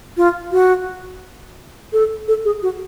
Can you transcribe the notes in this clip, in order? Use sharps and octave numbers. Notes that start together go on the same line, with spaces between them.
F4
F#4
A4
A4
G#4
F#4